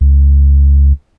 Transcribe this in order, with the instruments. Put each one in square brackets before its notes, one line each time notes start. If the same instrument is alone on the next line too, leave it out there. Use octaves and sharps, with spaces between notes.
[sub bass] C#2